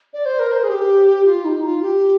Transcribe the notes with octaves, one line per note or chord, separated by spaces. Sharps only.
D5
C5
A#4
C5
G#4
G4
F4
D#4
F4
G4